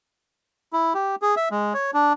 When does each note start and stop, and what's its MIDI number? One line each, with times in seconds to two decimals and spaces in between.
0.73 0.93 64
0.94 1.15 67
1.22 1.35 68
1.37 1.49 76
1.51 1.73 56
1.74 1.91 73
1.94 2.13 62